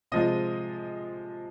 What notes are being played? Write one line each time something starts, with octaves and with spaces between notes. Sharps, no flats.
C3 F3 G#3 F4 D#5